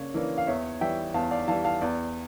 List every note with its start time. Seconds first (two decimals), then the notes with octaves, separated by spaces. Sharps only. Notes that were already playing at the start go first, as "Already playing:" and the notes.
Already playing: C#3 A#3 D4 C#5
0.14 E3 A#3 D4
0.38 F5
0.47 E2 C#5 E5
0.81 E3 G3 E5 G5
1.14 E2 F5 A5
1.31 D5 F5
1.47 E3 F5 A5
1.51 G3
1.64 F5 A5
1.81 E2 D5